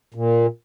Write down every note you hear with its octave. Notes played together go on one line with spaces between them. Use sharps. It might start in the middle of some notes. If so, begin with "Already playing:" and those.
A#2